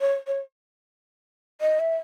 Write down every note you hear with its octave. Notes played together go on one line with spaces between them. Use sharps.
C#5
C#5
D#5
E5